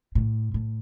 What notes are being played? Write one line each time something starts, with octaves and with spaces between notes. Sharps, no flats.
A2
A2